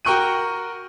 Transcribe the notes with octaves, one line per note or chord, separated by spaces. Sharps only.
F#4 A#4 G5 C#6 F#6 D#7